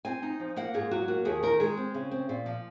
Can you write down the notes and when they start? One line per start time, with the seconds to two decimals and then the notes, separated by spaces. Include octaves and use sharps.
0.05 C4 G#5
0.23 D#4
0.40 F3
0.56 A#3 F#5
0.74 G#2 G#4
0.91 F#3 F#4
1.08 A#3 F#4
1.25 D#2 G#4
1.43 D#3 A#4
1.60 G#3 G#4
1.77 C4
1.94 C#3
2.11 C4
2.29 A#2
2.46 F3